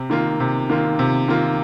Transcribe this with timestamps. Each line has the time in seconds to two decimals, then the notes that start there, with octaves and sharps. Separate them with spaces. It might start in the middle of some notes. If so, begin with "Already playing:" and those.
Already playing: C3
0.10 D#3 A#3 F4
0.40 C3
0.70 D#3 A#3 F4
0.99 C3
1.28 D#3 A#3 F4